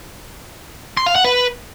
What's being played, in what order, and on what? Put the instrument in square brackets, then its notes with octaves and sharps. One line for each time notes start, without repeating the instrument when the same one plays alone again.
[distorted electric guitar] C6
F5
F#5
B4